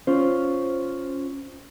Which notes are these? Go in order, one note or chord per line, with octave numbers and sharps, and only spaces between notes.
C#4 F4 C5